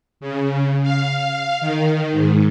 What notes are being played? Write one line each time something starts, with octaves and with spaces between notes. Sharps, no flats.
C#3
F5
F5
D#3
G#2